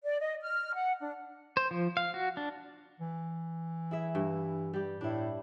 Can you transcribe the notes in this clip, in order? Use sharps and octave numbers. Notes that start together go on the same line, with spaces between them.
D5
D#5
F6
F#5
D4
C5
F3
F5
F#4
D4
E3
E4 G#4 E5
G2
G3 G4
A2 D4 E4